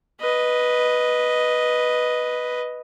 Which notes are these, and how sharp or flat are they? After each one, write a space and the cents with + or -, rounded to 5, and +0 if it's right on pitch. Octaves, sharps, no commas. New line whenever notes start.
B4 -5 D#5 +0